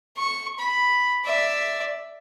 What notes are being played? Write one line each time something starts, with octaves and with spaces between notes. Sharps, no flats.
C#6
B5
D5 E5